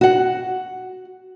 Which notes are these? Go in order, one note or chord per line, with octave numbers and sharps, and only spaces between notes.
F#4 F#5